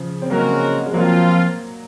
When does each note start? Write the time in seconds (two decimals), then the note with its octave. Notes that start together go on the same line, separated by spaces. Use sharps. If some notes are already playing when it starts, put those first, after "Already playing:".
Already playing: C#3 F3
0.22 C4
0.30 C#3 F#3 G#3 A#3 C#4 F#4 A#4
0.86 G#3
0.93 F3 F#3 A#3 C4 F4